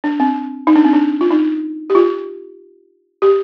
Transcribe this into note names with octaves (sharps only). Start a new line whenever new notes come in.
D4
C4
D#4
D4
C4
D4
F4
D#4
G4
F4
G4